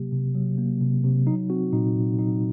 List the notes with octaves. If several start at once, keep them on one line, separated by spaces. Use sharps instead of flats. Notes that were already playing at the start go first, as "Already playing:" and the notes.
Already playing: C3 F#3 A#3 G4
C3
F#3
A#3
C3
C3
F#3 D#4
C4 F#4
A#2 D#4
A#2
F#3 D#4